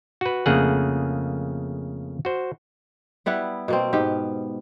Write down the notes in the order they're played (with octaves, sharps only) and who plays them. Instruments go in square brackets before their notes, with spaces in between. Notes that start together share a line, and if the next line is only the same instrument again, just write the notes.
[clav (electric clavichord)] F#4 B4
F2 C#3 A3 A#3 G#4 F#5
F#4 C5
[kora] G3 B3 E4 F#5
B2 A#3 C4
G#2 B3 G4